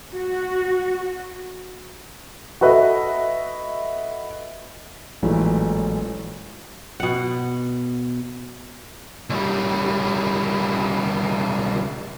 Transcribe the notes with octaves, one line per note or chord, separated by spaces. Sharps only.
F#4
F#4 A4 B4 D#5 E5
A1 A#2 E3 F#3 G#3 A3
B2 F#5
C#2 G3